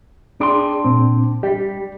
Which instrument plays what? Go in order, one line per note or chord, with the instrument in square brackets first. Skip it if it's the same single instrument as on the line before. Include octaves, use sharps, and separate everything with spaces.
[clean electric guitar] D4 G5 C6 [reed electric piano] G#4 D5
[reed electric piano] A#2 C4
[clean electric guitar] G3 [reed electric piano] G4